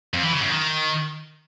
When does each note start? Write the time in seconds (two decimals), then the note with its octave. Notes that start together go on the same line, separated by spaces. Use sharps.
0.14 F2
0.23 E3
0.32 C#3
0.41 F#2
0.50 D#3